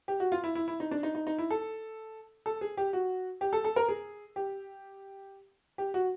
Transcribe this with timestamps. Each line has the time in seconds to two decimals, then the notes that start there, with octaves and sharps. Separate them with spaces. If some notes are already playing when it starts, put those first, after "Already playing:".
0.08 G4
0.20 F#4
0.32 F4
0.44 E4
0.55 E4
0.68 E4
0.80 D#4
0.91 D4
1.03 D#4
1.15 D#4
1.27 D#4
1.39 E4
1.51 A4
2.46 A4
2.61 G#4
2.77 G4
2.93 F#4
3.41 G4
3.53 A4
3.65 A4
3.76 A#4
3.89 G#4
4.36 G4
5.78 G4
5.94 F#4